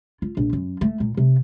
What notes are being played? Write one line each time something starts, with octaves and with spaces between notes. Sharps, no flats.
F4
A#1
F#2
A3
A#2
C3